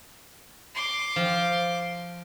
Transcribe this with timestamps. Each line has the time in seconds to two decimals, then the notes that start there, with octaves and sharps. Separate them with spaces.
0.75 C6 D6
1.16 F3